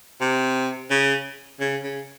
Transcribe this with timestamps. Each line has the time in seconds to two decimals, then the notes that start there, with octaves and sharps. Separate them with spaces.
0.20 C3
0.90 C#3
1.60 C#3
1.83 C#3